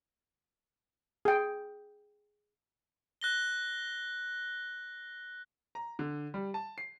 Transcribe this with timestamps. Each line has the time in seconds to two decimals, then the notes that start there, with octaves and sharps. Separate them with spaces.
1.25 G#4 G5
3.21 F#6 A#6 G7
5.75 A#5
5.99 D3
6.34 G3
6.54 A5
6.78 C7